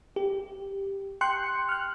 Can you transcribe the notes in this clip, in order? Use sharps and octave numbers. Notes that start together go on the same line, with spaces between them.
G4
G5 C6 F#6 C#7
F6 F#6